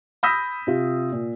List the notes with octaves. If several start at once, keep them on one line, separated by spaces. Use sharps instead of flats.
B5 D#6 E6 G6 A#6 B6
C3 F4
A#2